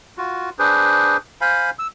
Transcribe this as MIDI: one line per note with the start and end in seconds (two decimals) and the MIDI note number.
0.18 0.50 65
0.18 0.50 66
0.59 1.17 62
0.59 1.17 68
0.59 1.17 71
0.59 1.17 72
1.41 1.70 72
1.41 1.70 77
1.41 1.70 80
1.41 1.70 83
1.79 1.88 88